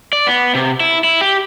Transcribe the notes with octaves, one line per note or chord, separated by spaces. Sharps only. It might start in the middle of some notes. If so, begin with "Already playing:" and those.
D5
B3
C3
E4
E4
G4